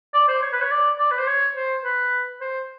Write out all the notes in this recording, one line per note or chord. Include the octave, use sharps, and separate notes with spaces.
D5
C5
C#5
B4
C#5
D5
D5
B4
C5
C#5
C5
B4
C5